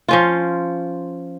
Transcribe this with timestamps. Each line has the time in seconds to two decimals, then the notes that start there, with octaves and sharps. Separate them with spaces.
0.08 F3 C#4 F4